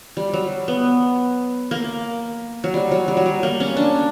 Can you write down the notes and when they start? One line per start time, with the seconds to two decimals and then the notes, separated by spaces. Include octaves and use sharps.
0.17 G3
0.33 F#3
0.68 B3
1.71 A#3
2.64 F#3
2.74 G3
2.91 F#3
3.08 G3
3.17 F#3
3.26 G3
3.43 A#3
3.60 C#4
3.77 D4